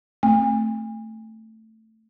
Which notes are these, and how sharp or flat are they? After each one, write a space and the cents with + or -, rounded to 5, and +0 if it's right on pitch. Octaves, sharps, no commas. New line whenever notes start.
A3 +10 C4 +20 G#5 -35